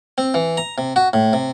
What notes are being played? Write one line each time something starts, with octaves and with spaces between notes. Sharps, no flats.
C4
E3
A#5
C3
F#4
A2
C3